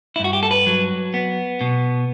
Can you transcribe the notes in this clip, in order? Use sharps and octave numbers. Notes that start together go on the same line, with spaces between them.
E4
G2 F#4
G4
A4
B4
F#3
B3
B2